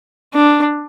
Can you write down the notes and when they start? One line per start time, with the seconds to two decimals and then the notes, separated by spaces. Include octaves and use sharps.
0.34 D4